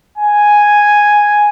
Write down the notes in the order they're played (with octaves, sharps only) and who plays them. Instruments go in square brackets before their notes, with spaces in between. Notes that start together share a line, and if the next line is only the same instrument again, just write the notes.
[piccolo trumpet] G#5